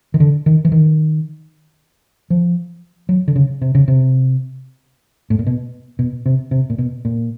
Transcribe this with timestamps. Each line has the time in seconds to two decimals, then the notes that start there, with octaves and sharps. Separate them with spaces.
0.14 D#3
0.20 D3
0.46 D#3
0.65 E3
0.72 D#3
2.30 F3
3.09 F#3
3.28 D3
3.36 C#3
3.61 C3
3.75 C#3
3.88 C3
5.30 A2
5.39 A#2
5.47 B2
5.99 B2
6.26 C3
6.51 C3
6.70 A#2
6.78 B2
7.05 A#2